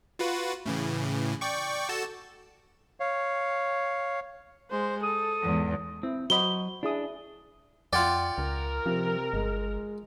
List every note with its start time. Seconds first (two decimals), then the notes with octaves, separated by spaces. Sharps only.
0.19 F4 F#4 B4
0.66 A2 C#3 E3
1.41 D5 G5 C#6
1.89 F#4 A4 A5
3.00 C#5 F5
4.71 G#3 C5
5.03 A4 D#6
5.43 E2 G#2
6.03 C4 E4
6.30 F#3 F#4 C5 D#5 B5 G7
6.83 D4 E4 G#4 D#6
7.93 F2 F4 D5 F#5 G5
8.38 C#2 A#4
8.86 C3 F3
9.33 G1 G#3